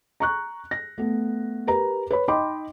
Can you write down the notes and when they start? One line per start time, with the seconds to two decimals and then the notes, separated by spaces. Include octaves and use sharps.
0.20 A#5 C#6 F#6
0.71 A#6
0.98 A3 B3
1.67 G4 A#4 B4 A#5
2.11 B4 C#5 B5
2.28 D#4 D#5 G5 B5 C6 D6